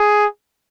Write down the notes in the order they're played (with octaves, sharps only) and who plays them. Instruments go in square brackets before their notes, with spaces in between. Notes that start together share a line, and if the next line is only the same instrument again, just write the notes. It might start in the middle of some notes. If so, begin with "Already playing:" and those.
Already playing: [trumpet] G#4